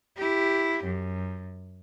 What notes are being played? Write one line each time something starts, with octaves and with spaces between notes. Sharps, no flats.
E4 G4
F#2